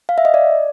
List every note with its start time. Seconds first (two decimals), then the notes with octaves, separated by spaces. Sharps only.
0.09 F5
0.18 E5
0.25 D#5
0.34 D5